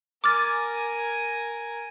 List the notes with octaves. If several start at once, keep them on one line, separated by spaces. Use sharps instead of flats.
A#4 G#5 D6 F6 A6